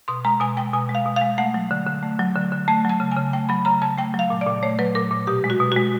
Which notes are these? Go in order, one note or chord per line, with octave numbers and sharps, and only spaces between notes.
B2 C6
G#3 A#5
B2 G#5
G#3 G5
B2 G#5
G#3
F5
B2
F5
G#3
A3 F#5
F#3
D3
D3
A3
F#3
D3
D3
A3 A5
F#3 A5
C#3
G#5
C#3
A3 G5
F#3 B5
C#3 A#5
C#3 A5
A3 G5
F#3 F5
A#2
D5
A#2
A3 C#5
F#3 B4
A#2 A#4
A#2
B2 G4
G#3
F#4
B2
G#3 F#4